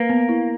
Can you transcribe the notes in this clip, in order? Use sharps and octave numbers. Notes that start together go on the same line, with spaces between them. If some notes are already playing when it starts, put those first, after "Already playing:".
Already playing: A#3 B4
B3
E4